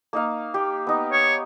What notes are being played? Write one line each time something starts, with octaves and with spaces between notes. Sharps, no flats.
A#3 D#4 F5
G4
B3 D#4
C#5